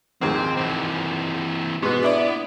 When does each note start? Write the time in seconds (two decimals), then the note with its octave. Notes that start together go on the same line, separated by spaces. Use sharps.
0.21 A#1 D#2 G#2 C4
0.57 E3 C4
1.82 G#2 B2 B3
2.02 D4 E4 D5